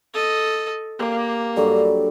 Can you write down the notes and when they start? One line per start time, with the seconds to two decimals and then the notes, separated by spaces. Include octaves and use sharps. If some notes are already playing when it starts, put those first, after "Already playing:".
0.14 A4 D#5
0.99 A#3 G4 F5 D6
1.57 G2 F#3 G3 A4